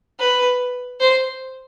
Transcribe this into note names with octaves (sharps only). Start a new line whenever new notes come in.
B4
C5